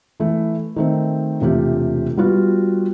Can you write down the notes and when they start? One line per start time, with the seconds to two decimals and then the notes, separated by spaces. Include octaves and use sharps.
0.20 E3 A3
0.76 D#3 A3 C4
1.41 E1 C3 A3 F4 G4
2.17 G3 B3 F4 F#4